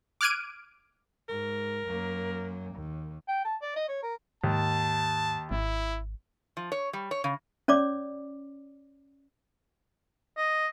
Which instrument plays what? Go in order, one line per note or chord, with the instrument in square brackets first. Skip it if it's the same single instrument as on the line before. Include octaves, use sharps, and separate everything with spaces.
[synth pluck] D6 F6 F#6 G#6 D7 D#7
[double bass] G#2 [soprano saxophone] A#4
[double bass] F#2 A#3
D#2
[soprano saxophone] G5
A5
D5
D#5
C#5
A#4
[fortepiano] D#2 [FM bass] G#2 [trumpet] A5
[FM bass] G#1 [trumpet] E4
[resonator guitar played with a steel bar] F3
C#5
G3
C#5
C#3
[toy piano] C#4 C#5 D5 D6
[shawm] D#5